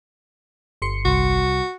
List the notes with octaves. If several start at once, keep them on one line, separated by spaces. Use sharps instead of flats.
G1 C6 C#7
C2 F#4